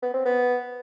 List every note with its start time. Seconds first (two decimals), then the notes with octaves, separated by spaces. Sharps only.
0.03 B3
0.14 C4
0.25 B3